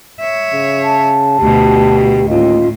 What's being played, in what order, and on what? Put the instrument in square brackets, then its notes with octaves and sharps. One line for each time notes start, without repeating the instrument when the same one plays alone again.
[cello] C#5 E5
[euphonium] C#3
[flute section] A5
[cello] D2 B2 [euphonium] G4
[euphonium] D#2 [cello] A2 [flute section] C#4 F4 D#5